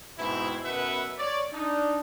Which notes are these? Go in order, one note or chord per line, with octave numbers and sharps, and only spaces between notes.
G#2 B2 C4 E4
F#2 B2 B4 E5 F#5
C#5 D5
D4 D#4